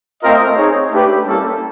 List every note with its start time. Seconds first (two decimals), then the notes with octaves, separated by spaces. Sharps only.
0.22 A3 C4 F4 A#4 D#5
0.56 C4 D#4 G#4 C#5
0.91 A3 D4 G4 B4
1.25 G3 A#3 C#4 E4 A4